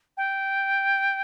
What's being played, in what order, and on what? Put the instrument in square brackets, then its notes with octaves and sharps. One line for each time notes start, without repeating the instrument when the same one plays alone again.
[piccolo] G5